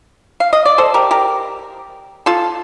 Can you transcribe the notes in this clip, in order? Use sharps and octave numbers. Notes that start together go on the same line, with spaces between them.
F5
D#5
D5
A4 C5
G4 A#4
G4 A#4
F4 A4